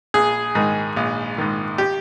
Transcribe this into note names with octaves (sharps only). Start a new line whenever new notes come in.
A#1 G#4
G#2 D#3
A#1
G#2 D#3
G4